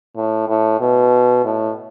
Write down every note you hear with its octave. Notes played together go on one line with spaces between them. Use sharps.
A2
A2
B2
A2